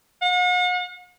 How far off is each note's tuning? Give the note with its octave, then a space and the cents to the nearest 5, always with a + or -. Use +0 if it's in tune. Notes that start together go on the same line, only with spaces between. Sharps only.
F#5 -45